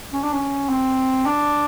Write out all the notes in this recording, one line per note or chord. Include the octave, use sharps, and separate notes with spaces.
C#4
D4
C#4
C4
D4